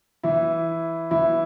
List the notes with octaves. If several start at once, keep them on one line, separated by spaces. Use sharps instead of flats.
E3 E4
E3 E4